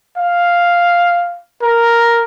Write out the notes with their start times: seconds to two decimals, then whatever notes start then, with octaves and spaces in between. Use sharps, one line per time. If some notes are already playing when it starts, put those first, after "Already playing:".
0.17 F5
1.62 A#4